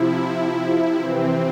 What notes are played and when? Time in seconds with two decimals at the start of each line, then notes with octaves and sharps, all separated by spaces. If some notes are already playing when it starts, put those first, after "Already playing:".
Already playing: C3 F3 E4
0.95 C3 E3 C4